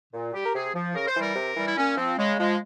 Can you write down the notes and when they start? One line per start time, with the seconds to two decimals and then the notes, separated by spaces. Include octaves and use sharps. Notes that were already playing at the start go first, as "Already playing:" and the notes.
0.13 A#2
0.34 G3 G4
0.46 A#4
0.54 C3 G#4
0.75 F3
0.95 C#3 A#4
1.08 C5
1.16 E3 G3 A#4
1.36 C3
1.57 E3 G3
1.67 E4
1.77 A#2 C#4
1.97 F3 C4
2.18 C#3 G#3
2.39 F3 G#3